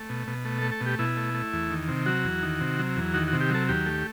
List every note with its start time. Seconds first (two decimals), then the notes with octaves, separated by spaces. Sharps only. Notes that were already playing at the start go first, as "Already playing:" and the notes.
Already playing: A3
0.09 B2
0.27 B2
0.45 A3
0.59 A3 A4
0.72 A4
0.81 B2
0.86 G4
0.99 B2 E4
1.17 A3
1.34 A3
1.53 E2
1.71 D#3
1.88 C3
2.06 F#3 F#4
2.24 E2
2.43 D#3
2.61 C3
2.79 F#3
2.97 E2
3.14 D#3 F#4
3.27 F#4
3.33 C3
3.41 G4
3.50 F#3 A4
3.69 D#2 G4
3.86 A3